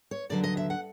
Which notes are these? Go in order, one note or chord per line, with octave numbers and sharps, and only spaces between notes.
C#5
D#2 D3 F#3 D5
D#5
E5
F#5